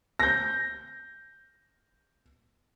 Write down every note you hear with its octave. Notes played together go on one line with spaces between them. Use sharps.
G6 A#6